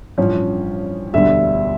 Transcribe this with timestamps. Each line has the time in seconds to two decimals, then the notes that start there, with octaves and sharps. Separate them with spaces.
0.18 A1 G2 F3 C#4
1.13 E1 D2 D3 G3 E5